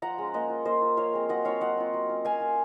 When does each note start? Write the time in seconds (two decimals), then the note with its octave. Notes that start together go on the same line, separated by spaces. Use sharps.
0.02 F3 F#5 A#5
0.18 G#3 C#4
0.34 A#3 D#5 F#5
0.49 F4
0.65 A#3 C5 D#5
0.82 F4
0.97 F3 C#5 F5
1.13 G#3 C4
1.29 F#3 D#5 F#5
1.45 C4 F4 C#5 F5
1.61 F#3 D#5 F#5
1.77 C4 F4
1.94 F#3
2.09 C#4 F4
2.25 A#3 F5 G#5
2.40 F4